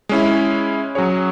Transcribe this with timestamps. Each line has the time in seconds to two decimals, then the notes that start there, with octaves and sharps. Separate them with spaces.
0.09 G#3 C#4 E4
0.95 F#3 C#4 G#4 C#5